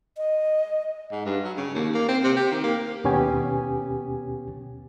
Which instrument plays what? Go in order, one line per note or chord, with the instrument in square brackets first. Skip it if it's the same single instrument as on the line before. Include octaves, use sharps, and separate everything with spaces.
[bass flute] D#5
[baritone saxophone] G#2
G2
F#3
C#3
D#2
A#3
C4
C3
G4
D#3
A#3
[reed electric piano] D#2 B2 B3 C#4 G4 G#5